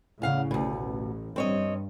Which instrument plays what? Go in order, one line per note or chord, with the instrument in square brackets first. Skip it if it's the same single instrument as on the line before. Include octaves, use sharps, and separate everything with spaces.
[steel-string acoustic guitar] E2 F5 F#5 [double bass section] A2 C#3
[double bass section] A1 [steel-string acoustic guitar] D2 B2
[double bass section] G2 [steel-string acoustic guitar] C4 C#5 D#5